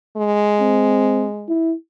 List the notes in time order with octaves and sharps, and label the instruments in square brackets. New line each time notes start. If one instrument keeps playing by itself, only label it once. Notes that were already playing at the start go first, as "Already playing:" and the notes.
[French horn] G#3
[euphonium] C4
E4